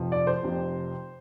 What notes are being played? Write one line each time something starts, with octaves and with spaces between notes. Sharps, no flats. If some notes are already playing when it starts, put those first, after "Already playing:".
Already playing: F1 F2 C3 F3
D5
C5
F1 F2 C3 F3